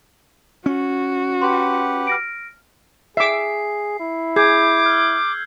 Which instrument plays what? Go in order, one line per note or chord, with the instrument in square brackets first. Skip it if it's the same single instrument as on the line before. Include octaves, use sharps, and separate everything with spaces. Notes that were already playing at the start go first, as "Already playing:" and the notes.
[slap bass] C#4 [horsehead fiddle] F#4
[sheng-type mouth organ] G4 B4 F#5 [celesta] C6
[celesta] F6 A#6 D7
[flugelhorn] G#4 [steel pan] E5 D6 [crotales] C7
[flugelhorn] E4
[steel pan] G#4 [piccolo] D6 [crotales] G6 G#6 C7
[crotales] E6 F6